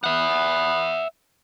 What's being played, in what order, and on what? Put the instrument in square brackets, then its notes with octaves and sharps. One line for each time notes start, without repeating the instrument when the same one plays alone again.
[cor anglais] B3 [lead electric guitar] E5 F#5